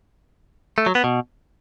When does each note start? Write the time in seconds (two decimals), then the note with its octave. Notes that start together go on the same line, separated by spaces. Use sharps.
0.78 A3
0.86 F#3
0.95 B3
1.04 B2